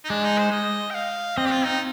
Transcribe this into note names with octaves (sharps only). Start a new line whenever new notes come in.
D#4
G#3 D4
D#4
C5
D#5
G5
F5
C4 D#5
G4
F4
D#4